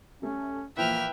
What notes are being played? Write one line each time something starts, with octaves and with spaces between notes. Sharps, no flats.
G3 A3 C#4
A#2 E3 F3 A#3 B4 E5 G5 F6